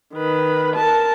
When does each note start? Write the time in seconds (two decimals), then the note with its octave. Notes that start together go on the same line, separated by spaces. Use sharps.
0.14 D#3 B4
0.76 A#4 A5